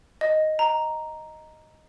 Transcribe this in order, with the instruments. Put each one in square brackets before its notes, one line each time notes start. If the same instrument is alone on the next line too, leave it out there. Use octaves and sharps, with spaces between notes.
[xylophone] D#5
A#5